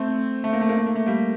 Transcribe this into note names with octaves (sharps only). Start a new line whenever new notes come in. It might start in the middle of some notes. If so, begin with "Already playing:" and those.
Already playing: A3 C4
A3
A#3
A3
A#3
A3
A#3
A3
G3 A#3